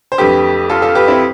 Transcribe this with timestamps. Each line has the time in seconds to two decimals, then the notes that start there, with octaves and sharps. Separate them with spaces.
0.12 C5
0.18 F2 D3 A3 G4 B4
0.70 F4 A4
0.82 F4 A4
0.95 G4 B4
1.08 C4 E4